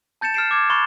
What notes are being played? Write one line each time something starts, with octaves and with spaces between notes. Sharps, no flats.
A5 G6 A6 C#7 E7
F6 A6 C7 D7 E7
D6 G#6
B5 C#6 F6 F#6 A6 E7